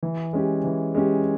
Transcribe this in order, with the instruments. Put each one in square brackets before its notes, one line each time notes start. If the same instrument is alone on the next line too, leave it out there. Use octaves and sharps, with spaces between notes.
[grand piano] E3
G#3 C#4 G4
E3
G#3 C#4 G4